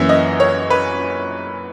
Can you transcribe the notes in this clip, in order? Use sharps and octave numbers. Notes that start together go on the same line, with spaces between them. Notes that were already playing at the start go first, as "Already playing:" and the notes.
Already playing: F#2 E3 A#3 C#4 E5
D#5
C#5
B4